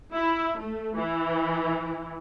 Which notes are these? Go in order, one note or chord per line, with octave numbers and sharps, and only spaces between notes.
E4
A3
E3